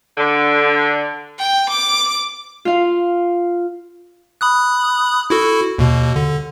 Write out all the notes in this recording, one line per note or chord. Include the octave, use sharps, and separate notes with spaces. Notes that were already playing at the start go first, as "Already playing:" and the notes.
D3
G5
D6
F4 F5
B5 D#6 F#6
E4 F#4 A4
D#2 B2
D3